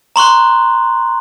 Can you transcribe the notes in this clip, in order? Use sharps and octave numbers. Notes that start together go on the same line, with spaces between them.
A#5 C6 C#6 F#6